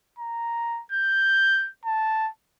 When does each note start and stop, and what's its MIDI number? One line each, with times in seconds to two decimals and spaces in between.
0.19 0.81 82
0.92 1.69 91
1.85 2.29 81